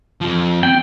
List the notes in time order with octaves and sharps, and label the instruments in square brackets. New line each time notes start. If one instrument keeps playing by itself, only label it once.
[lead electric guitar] F2 F3
[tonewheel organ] B3 C4 [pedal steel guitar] G5